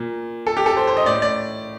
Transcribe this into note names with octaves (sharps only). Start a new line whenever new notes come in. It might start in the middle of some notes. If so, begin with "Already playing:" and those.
Already playing: A#2
A4
G4
A4
C5
C5
D#5
A2 D5
D5